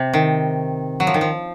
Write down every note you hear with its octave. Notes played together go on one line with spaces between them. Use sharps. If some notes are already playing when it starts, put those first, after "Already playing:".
Already playing: C3
D#3
F#3
F3
D#3
F3